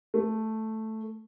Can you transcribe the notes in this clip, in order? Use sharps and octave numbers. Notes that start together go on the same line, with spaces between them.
A3